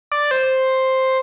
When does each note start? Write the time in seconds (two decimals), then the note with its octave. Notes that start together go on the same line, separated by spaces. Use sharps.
0.12 D5
0.31 C5